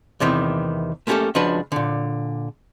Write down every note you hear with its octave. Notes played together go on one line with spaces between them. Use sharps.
E2 C3 D#3 E3
A3 A#3 C#4 D#4 G4 A4
C#2 F3 D4 F#4 B4
A#2 D3